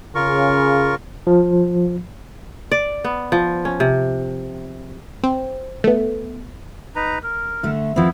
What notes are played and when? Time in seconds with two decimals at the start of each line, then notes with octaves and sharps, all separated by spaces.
0.15 C#3 F4 A#4 C#6
1.27 F3
2.72 D5
3.04 B3
3.32 F3
3.65 C#4
3.80 C3
5.24 C4
5.84 A3 B3
6.95 D#4 B4 A#5
7.23 A#4
7.63 D3 A3
7.96 F3 B3 C4 E4